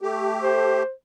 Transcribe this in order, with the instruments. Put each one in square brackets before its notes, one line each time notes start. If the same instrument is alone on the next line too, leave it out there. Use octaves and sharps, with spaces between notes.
[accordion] A3 G4
[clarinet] C5